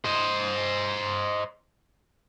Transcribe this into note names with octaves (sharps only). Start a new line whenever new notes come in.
C5 D#5